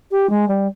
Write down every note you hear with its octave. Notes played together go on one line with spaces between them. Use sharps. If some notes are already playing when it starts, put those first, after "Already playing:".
G4
G#3
G3